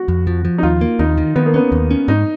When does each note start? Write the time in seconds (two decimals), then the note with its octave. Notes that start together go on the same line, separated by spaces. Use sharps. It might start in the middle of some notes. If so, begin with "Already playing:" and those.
Already playing: F#4
0.08 F2
0.27 F3
0.45 F3
0.58 D#4
0.63 D#2 F4
0.81 A#3
0.99 D#2 D#4
1.18 D#3
1.36 D#3 B3
1.46 A#3
1.54 B3 C#4
1.72 D#2
1.91 C#4
2.08 G#2 D#4